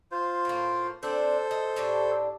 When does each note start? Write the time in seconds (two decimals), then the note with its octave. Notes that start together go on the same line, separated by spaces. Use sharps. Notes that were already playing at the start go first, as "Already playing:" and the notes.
0.11 F4 C5
0.45 A2 A#3
1.03 C4 D4 A4 C5
1.51 D#5
1.76 A2 D4 G4